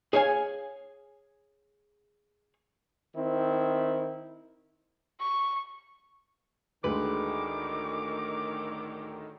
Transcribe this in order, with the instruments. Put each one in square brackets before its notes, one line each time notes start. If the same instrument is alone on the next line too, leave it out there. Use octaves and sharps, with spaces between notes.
[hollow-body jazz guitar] G#4 C#5 F5 G#5
[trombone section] D#3 C4 E4
[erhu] C#6
[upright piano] D2 G#3 [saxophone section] A2 D3 D#3 [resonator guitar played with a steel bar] B4 [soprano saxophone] D6